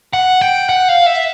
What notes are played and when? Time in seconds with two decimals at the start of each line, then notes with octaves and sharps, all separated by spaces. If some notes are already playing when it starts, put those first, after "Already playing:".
0.13 F#5
0.41 G5
0.69 F#5
0.89 F5
1.06 E5